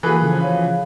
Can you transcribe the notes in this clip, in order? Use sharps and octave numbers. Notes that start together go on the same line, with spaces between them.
E3 A#3 F#4 G#4 A4 B4 B5 F#6
C#3 F3
C#5 F5